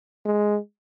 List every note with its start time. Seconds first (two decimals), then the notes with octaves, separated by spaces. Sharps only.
0.25 G#3